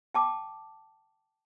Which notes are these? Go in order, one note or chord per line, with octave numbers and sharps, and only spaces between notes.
G5 A5 D6